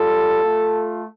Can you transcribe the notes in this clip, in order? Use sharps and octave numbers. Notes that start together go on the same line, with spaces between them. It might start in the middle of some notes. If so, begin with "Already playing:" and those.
Already playing: G3 F4 A4
A3 F4